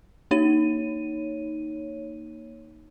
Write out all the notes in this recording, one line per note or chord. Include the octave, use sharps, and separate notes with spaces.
A#3 D#4 C#5 D#7